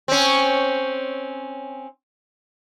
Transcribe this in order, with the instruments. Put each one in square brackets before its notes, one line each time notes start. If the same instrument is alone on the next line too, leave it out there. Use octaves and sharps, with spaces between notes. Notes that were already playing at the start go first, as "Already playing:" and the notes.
[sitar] C4 C#4